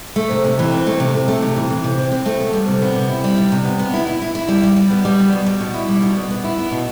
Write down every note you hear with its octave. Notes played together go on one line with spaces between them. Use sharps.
A3
C3
C3
E3
C4
A3
C3
A3
A3
C3
E3
E3
C3
C4
C4
A3
B3
G3
C3
B3
C3
E4
G3
C3
C3
B3
B3
E4
E4
E4
E4
G3
G3
G3
B3
G3
B3
B2
G3
B2
E4
G3
B2
B3
B3
E4
B3
B2